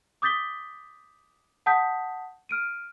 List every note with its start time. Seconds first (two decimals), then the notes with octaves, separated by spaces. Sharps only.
0.22 D6 D#6 G6 A6 B6 G7
1.66 F#5 A5 D#6 G6 B6
2.49 F6 D7 D#7